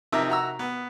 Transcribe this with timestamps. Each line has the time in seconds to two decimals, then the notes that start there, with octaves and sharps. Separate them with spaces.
0.12 C3 F3 D#4 A#4 E5
0.30 F#4 A#5 E6
0.59 B3